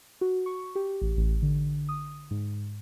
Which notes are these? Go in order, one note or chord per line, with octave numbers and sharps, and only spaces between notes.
F#4
C#6
G4
A1
A1
D3
D#6
G#2